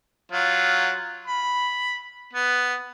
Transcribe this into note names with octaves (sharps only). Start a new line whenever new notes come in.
F#3 F4
B5
B3